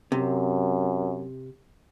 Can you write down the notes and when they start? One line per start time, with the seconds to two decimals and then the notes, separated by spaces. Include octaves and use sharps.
0.12 F#2 C3